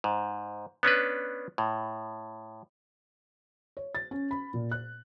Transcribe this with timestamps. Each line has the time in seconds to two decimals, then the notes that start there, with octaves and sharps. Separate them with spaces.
0.04 G#2
0.83 B3 C#4 D4 B4
1.58 A2
3.77 C#5
3.95 A6
4.11 C#4
4.31 B5
4.54 A#2
4.72 F#6